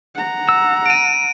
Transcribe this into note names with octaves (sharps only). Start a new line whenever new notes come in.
F#5 A#5
E6
D7 D#7